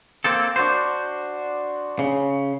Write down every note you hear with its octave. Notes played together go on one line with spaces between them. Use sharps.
A#3 C4 A4
D4 F#4 C5
C#3